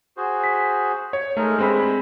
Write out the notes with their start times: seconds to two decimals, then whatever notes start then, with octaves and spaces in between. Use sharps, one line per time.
0.17 F#4 G#4 C5
0.44 B6
1.13 C#5
1.37 G#3 A3 D#4 A#4
1.59 G2 G#3 C4 B5